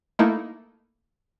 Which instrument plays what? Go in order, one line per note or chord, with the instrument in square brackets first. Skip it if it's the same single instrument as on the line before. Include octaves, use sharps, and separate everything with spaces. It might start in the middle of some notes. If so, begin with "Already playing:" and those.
[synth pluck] A3 A#3 D#4 E4